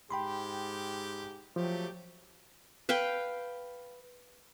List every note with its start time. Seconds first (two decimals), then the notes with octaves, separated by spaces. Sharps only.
0.11 G#2 G4 G5 B5 C6
1.56 F3 F#3 A3 G4
2.89 B4 F5 G5